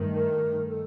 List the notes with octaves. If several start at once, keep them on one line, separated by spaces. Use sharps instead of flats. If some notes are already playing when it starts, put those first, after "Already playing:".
Already playing: G2 D#3 A3
A#4
A4